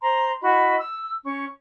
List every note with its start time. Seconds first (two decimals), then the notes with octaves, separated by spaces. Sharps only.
0.02 C5 A#5 C6
0.42 E4 F#4 D#5 B5
0.77 E6
1.24 C#4 C#6